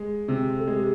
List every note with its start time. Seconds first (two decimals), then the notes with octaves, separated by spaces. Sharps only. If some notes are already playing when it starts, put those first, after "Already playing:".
Already playing: G#3
0.28 C3
0.58 A4
0.67 G#3 G#4
0.78 G4